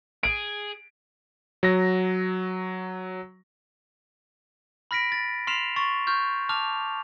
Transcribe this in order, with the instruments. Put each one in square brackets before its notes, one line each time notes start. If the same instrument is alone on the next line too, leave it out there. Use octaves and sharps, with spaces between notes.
[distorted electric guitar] G#4 [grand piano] D7
[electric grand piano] F#3 A#6
[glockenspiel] B5 F6 A#6 B6 D7
A6
C6 F6 B6 C7 E7 F7
C6 C#6 A6
C#6 F6 G6
A5 D6 F6 F7